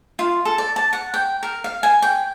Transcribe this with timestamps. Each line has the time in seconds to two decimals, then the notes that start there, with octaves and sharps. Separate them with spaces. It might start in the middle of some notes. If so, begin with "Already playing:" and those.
0.19 F4
0.45 A4
0.58 D5
0.76 A5
0.93 F#5
1.14 G5
1.43 A#4
1.64 F5
1.83 G#5
2.02 G5